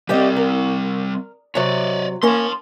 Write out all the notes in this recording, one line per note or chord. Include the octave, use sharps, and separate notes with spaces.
G3 C4 G4 D5 D#5
A#4
C3 F#3 C#5 D5
A#3 C#4 C#5 A5 C6